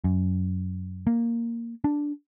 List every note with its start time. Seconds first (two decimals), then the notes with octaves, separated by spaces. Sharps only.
0.04 F#2
1.07 A#3
1.84 D4